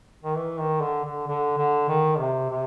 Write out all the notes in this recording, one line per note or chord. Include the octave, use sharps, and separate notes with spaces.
D#3
E3
D#3
D3
D3
D3
D3
D#3
C3
C3